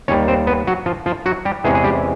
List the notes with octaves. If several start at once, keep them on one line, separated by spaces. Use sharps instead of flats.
D#2 D#3 G3 C#4 C#5
C4 C5
B3 B4
F#3 F#4
F3 F4
F3 F4
F#3 F#4
G3 G4
E2 C3 E3 G#3 C#4 G#4
G#4
G3 G4